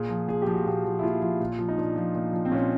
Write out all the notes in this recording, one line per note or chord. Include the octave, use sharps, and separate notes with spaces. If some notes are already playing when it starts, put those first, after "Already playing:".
Already playing: A#2 G#4
F3
A#2 G#4
G4
F3
F#4
A#2 G4
F3
E4
A#2 F4
F3
A#2
F3
D#4
A#2 D4
F3
A#2
F3
C4
A#2 C#4